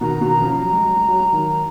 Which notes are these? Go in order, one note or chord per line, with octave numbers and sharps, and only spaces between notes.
B2 D#3 A#5
B2 D#3
A#5
C#3 F3
A#5
F#3
G#3
F#3
G#3
F#3
G#3
D#3 F#3